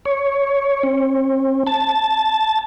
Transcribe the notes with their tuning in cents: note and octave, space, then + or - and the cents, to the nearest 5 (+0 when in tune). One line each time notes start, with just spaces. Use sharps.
C#5 +5
C4 +40
A5 -5